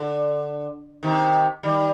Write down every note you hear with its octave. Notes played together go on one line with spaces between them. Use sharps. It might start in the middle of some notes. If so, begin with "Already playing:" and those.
Already playing: D3
C3 D#3
D#3 G3